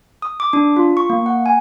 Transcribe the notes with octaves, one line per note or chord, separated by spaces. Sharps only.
D#6
D6
D4
F4
C#6
A#3
F#5
G#5